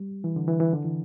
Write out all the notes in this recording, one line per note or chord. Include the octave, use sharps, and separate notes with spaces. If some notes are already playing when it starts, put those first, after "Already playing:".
Already playing: G3
E3
D3
E3
E3
D3
E3